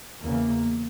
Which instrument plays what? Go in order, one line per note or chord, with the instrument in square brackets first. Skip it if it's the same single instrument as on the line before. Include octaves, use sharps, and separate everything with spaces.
[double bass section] E2 C#3 A#3